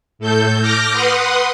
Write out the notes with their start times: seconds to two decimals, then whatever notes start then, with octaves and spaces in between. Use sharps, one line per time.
0.19 A2 A4 G6
0.61 D6 F6 G6 A#6
0.93 B4 F#5 C6 D#6